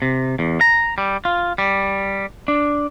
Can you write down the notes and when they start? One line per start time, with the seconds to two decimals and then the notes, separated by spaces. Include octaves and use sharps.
0.02 C3
0.39 E2
0.61 A#5
0.98 G3
1.25 F4
1.58 G3
2.48 D4